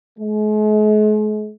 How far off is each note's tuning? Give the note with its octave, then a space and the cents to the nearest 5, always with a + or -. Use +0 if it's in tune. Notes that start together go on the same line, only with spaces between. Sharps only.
G#3 +45